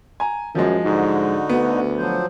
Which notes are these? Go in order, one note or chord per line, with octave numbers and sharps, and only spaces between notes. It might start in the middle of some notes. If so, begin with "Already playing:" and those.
G#5 A#5
F#2 F3 F#3 G#3
G#2 D3 D#4 F#4
D2 B3
F3 F#3 C5